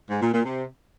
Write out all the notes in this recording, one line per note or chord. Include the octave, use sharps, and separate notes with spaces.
G#2
A#2
A#2
C3